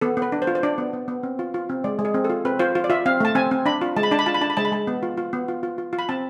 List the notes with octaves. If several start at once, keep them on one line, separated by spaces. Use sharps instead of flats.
B3 A4
B3
B4
D4
C5
F4
C5
D4 D5
B3
B3
B3
C4
F4
F4
C4
G#3 D5
G#3
G#4
C4
A4
F4
C4 B4
F4 C5
F4
D5
F4 E5
C4 F5
A3 A5
C4 G#5
C4
D4 B5
F4
G#3 A5
B5
D4 A5
B5
F4 A5
B5
D4 A5
B5
G#3 A5
B5
G#3 A5
B3
F4
F4
B3
F4
F4
F4
F4
B5
C4 A5